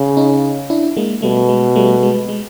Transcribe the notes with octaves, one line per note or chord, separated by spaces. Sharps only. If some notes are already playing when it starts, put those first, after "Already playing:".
Already playing: C#3
C#4 D#4
D4 E4
G#3 A#3
B2 G3 A3
G#3
G3 A3
G#3
G#3